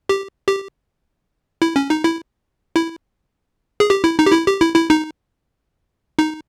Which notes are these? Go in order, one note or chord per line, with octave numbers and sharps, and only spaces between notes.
G4
G4
E4
C#4
D#4
E4
E4
G#4
G4
E4
D#4
G4
E4
G4
E4
E4
D#4
D#4